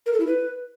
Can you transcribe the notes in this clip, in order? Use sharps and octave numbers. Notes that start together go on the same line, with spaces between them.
A#4
A4
E4
B4